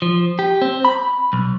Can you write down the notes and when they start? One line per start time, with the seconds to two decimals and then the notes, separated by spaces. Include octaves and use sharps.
0.02 F3
0.39 G4
0.62 C4
0.85 B5
1.33 B1